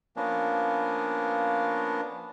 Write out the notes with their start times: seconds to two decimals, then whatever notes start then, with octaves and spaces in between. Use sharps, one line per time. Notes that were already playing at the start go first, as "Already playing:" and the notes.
0.16 F3 A#3 B3 C#4 D4